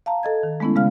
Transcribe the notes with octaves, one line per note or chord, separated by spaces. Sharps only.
F5 A5 A#5
A4 D#5 G#6
D#3
G#3 A3 B3 C#4 E4
C#3 G#3 F5 F6